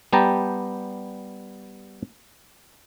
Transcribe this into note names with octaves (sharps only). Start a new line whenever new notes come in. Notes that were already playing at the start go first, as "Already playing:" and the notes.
G3 B3 G4 G5 A5 A#5